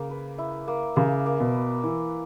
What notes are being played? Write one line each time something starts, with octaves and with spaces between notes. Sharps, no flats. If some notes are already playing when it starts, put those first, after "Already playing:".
Already playing: C#3 A#3
B4
E4
A#3
C#3 A#3
A#3
B2
B4
E3 A#3